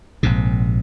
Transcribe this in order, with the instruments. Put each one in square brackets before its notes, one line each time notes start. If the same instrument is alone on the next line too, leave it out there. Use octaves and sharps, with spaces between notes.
[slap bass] A#1 G#2 C3